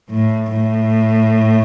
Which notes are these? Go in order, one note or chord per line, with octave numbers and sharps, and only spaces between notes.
A2
A2